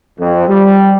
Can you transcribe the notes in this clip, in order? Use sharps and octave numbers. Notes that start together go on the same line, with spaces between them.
F2
G3